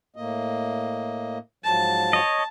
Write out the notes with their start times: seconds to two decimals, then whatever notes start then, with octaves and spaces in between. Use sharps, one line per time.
0.16 A2 A#3 D#5
1.64 G#2 F3 F#3 A5
2.13 C#5 D#5